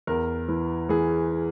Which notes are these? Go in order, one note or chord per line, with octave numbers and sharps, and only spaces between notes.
E2 A#4
E3
E3 G#4